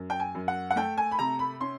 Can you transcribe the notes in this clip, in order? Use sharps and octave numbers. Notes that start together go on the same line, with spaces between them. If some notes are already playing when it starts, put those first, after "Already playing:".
Already playing: F#2
G5
G#5
F#2
F#5
F#5
A3 G5
G#5
B5
C3 A#5
B5
C#4 C6